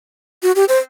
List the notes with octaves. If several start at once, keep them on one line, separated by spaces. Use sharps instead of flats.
F#4
G4
C5